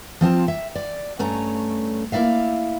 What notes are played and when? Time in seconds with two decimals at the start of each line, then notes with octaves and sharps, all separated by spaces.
0.21 F3 C4 F4 A5
0.48 E5
0.75 D5
1.19 G2 A3 C#4 A#5
2.12 A#3 E4 D5 E5 F5